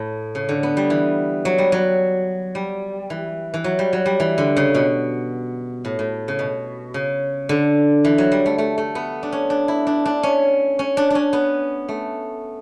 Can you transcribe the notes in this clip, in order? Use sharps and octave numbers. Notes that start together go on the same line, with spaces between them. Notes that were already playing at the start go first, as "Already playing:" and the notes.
Already playing: A2
C#3
D3
B3
G3
E3
F#3
G3
F#3
G3
E3
E3
F#3
G3
F#3
G3
E3
D3
C#3
B2
A2
A2
C#3
B2
C#3
D3
E3
F#3
G3
A3
A3
A3
B3
D4
C#4
D4
E4
D4
D4
C#4
C#4
D4
C#4 D4
B3
A3